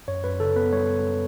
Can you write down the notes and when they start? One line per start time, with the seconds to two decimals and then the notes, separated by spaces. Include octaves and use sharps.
0.08 F#2 C#5
0.24 F#2 B4
0.40 C#3 A4
0.56 B3 B4
0.73 G3 C#5
0.89 G3